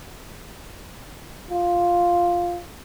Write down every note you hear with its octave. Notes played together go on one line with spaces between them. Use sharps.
F4